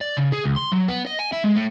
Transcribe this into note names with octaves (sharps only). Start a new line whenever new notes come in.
D5
C#3
G#4
C#2
C6
F#3
B3
D#5
G#5
E4
G#3
A2